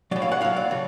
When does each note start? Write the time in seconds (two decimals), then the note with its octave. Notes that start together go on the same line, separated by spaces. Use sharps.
0.11 F#3 D5
0.16 A2
0.22 F5
0.32 F#5
0.41 A2 F#3 F5
0.56 D5
0.71 C#3